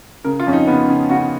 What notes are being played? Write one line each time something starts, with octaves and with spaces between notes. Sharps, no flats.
C#3 A#4
F4
F2 C#4
D#4
C#3 B3
C#3
C#3 F#4